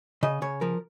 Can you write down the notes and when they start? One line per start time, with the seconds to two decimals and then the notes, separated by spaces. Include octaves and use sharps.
0.23 C#3 D#5
0.42 C#3 C#5
0.61 F3 A#4